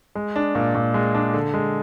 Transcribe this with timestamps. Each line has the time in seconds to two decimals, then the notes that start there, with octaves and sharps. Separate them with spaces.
0.15 G#3
0.36 D4
0.55 A#2
0.75 A#2
0.94 G#3
1.14 D4
1.34 D3
1.54 G#3